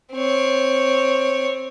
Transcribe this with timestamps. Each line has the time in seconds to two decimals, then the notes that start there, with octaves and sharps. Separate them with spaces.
0.15 C4 C#5